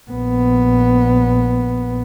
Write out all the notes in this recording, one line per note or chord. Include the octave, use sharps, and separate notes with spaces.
A#1 B3